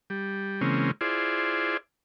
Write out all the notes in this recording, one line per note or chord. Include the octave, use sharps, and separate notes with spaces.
G3
C#3 E3 G#3 A#3 C4 C#4
E4 F4 G#4 C5 D5